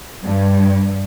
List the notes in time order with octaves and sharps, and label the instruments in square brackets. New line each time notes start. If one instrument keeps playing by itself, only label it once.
[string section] G2